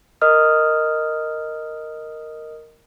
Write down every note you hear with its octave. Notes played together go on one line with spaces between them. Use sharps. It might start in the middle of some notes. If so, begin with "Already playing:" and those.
A#4 D#5 D#6 F6